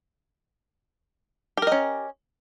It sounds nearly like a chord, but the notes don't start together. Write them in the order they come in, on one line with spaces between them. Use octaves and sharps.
G4 A#4 D#5 C#4